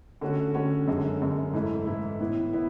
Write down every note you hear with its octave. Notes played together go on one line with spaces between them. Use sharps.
D3 A3 C#4 F#4
D3 A3 C#4 F#4
F#2 D3 G#3
F#2 D3 G#3
G#2 E3 A3 E4
G#2 E3 A3 E4
A2 E3 B3 E4
B3 E4